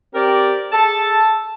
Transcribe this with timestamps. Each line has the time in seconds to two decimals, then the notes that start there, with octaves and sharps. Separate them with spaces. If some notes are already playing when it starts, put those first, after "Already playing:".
0.13 C4 G4 A#4 D5
0.72 G#4 A4 A5